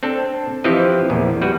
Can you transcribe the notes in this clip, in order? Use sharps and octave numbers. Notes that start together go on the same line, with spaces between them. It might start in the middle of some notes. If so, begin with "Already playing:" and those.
C4 D4 A4
E3 F3 C4 G4 D#5
A#1 E2
G3 F#4 B4